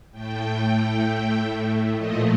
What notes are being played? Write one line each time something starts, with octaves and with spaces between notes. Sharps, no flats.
A2 A3 G5
A#2 F3 A3 D#5